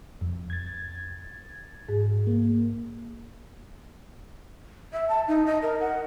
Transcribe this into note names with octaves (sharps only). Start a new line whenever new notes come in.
F2
G#6 A6
G#2 G#4
A#3
E5
A5
D#4
D#5
A#4
F#5